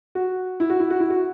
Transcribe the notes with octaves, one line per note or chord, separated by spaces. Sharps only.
F#4
E4
F#4
E4
F#4
E4
F#4